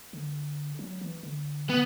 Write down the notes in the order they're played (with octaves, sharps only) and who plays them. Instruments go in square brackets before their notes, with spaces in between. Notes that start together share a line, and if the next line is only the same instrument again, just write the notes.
[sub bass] D3
F#3
E3
D3
[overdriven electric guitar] B3